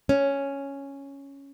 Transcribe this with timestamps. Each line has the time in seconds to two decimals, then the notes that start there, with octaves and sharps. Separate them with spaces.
0.09 C#4